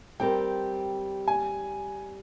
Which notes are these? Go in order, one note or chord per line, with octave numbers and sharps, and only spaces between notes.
G3 C4 G4 A#4 G5
G#5